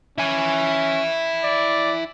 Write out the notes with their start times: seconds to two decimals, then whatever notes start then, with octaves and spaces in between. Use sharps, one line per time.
0.18 C#4 E4 G#5
1.44 D5